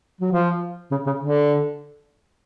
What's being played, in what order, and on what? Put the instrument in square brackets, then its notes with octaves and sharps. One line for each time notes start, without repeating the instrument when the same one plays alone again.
[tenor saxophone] F#3
F3
C#3
C#3
D3